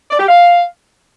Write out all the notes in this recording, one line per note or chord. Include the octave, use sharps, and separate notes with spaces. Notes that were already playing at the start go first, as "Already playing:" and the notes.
D5
G4
F5